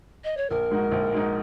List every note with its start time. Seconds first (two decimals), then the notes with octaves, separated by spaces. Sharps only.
0.24 D#5
0.37 C#5
0.49 A#1 A#4
0.70 G#2 G#3 D#4 F#4
0.92 A#1
1.13 G#2 G#3 D#4 F#4